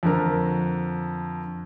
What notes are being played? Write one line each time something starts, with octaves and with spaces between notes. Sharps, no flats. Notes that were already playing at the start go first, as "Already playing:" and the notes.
F2 D3 A#4